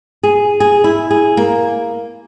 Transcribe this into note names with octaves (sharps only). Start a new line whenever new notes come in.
G#4
G#4
E4
G#4
A#3